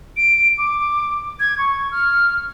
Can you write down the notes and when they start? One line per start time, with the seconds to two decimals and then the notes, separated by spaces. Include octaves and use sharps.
0.17 D7
0.58 D6
1.40 G#6
1.58 C#6
1.92 F6